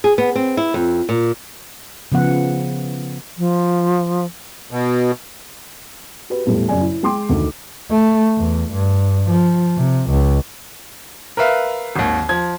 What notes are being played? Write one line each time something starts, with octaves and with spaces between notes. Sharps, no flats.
G#4
B3
C4
E4
F2
A#2
C#3 F3 B3 F#5
F3
B2
F#4 G4 B4
E2 A2 G3 A3
F#2 C#3 D5 G#5
E4
G#3 G5 C6 D6
D2 D#3 A4
A3
E2
G2
F3
C3
C#2
A#4 B4 E5 F5
G#1 D#2
F3 G#6